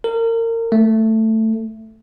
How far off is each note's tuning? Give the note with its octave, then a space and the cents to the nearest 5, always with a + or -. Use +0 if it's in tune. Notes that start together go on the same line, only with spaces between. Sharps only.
A#4 -30
A3 +10